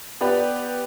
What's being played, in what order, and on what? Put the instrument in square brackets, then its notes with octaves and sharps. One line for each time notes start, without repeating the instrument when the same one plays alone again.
[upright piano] B3 G4 B4 D5